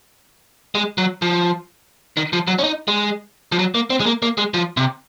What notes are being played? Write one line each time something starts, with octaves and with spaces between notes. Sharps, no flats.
G#3
F#3
F3
D#3
F3
F#3
C#4
D#4
G#3
F3
F#3
A#3
C4
G#3
A#3
A#3
G#3
F3
C3